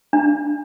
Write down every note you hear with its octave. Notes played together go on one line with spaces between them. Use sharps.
D4